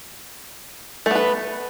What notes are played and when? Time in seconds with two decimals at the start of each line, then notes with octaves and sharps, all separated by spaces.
1.06 A3
1.11 B3
1.15 B4